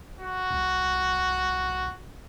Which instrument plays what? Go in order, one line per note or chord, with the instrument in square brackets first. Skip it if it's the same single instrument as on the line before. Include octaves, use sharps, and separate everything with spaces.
[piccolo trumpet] F#4
[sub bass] C2